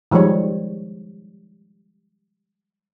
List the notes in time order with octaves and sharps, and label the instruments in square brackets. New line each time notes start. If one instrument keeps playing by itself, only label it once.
[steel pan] D#3 F3 G3 G#3 C#5